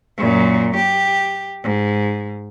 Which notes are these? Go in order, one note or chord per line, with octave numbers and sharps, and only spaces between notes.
F#2 A#2
G4
G#2